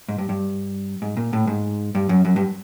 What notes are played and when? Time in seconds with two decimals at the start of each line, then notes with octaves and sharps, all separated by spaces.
0.09 G#2
0.18 G2
0.29 G2
1.02 G#2
1.17 A#2
1.33 A2
1.47 G#2
1.95 G2
2.09 F#2
2.25 F#2
2.36 G2